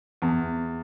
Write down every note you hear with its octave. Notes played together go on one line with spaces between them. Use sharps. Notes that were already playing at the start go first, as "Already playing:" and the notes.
E2